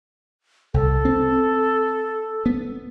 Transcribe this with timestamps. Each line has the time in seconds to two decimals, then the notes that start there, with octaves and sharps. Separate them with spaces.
0.74 C2 A4
1.05 C4
2.46 B3